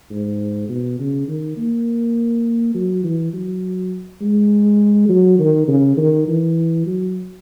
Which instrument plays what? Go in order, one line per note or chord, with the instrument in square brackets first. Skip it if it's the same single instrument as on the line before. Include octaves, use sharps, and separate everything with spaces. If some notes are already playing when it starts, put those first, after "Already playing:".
[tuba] G#2
B2
C#3
D#3
A#3
F#3
E3
F#3
G#3
F#3
D#3
C#3
D#3
E3
F#3